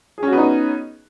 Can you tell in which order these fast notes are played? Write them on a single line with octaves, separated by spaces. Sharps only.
G#4 C#4 F#4 B3 D#4